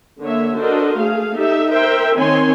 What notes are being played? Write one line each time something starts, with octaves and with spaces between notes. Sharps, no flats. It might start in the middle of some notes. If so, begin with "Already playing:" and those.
D3 A#3 C#5 E5
D4 F#4 A4 A#4 C5 D#5
A3 G#4 F5
D#4 G4 A4 E5
A#4 C5 E5 G5
D#3 C4 C#5 G#5 C6